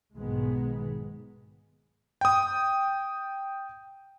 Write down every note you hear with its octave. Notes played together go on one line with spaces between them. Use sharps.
B1 G#2 D#3 G#3 B3
G5 D#6